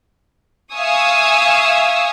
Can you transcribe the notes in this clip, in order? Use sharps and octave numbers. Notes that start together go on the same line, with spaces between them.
E5 F5 G#5 C#6 D#6 E6